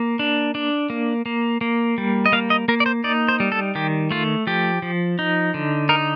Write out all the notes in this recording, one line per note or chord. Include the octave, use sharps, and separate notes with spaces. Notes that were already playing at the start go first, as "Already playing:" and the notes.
Already playing: A#3
D4
D4
A#3
A#3
A#3
G3
D#5
A#3 F5
D#5
A#3 A#4
D5
C5
D#4 D5
C5
G3
A4
D#3 G4
A3 F4
F3 G4
F3
D#4
D3
D#4 A#4